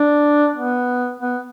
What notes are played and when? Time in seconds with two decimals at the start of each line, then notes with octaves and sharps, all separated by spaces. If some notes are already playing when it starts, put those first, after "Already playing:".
Already playing: D4
0.55 B3
1.20 B3